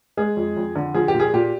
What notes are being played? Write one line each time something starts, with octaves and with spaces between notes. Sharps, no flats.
G#3 G#4
F2
F2
D3
F3 G#4
G4
A#2
G#4
A#2 G4